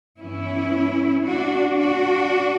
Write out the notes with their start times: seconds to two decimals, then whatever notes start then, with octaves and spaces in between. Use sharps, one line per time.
0.19 G2 E3 B3 C#4 E4
1.24 D4 F#4
1.77 D4 F#4